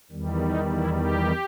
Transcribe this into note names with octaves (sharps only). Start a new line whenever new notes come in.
E2 D#3 G3
D#4
E4
G4